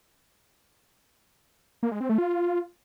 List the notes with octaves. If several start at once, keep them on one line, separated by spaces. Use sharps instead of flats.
A#3
G#3
C4
A3
F4